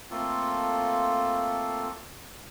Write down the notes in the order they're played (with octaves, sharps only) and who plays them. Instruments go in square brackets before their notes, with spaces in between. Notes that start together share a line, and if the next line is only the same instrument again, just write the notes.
[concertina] A3 A#3 C4 F4 A4